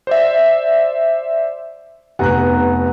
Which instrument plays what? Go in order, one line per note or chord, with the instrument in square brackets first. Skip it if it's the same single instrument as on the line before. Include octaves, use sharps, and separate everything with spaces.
[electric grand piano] C5 D5 E5
[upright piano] F1 B3 [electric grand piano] F#5 A#5 F#6